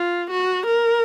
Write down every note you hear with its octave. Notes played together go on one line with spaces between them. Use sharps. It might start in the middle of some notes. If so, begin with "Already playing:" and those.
Already playing: F4
F#4
A#4